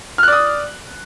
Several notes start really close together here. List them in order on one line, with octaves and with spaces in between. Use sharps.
F6 F#6 D5 D#6